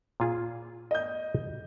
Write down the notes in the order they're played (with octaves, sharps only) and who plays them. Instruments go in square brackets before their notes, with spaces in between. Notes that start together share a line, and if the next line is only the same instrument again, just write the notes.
[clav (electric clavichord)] A#2 F4 G#4
[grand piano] D#5 G6